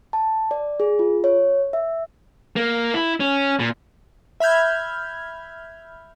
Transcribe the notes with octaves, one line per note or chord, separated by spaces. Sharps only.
A5
D5
G#4
F4
C#5
E5
A#3
E4
C#4
A#2
E5 B5 F6 G6 G#6